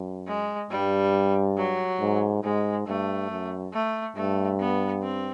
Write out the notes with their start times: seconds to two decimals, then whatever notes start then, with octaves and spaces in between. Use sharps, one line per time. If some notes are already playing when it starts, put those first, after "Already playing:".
Already playing: F#2
0.27 G#3
0.71 G2 G3
1.57 F#3
2.00 G#2
2.43 G#2 G#3
2.87 G2 A3
3.30 F#2
3.73 A3
4.16 G2 A3
4.59 B3
5.03 C4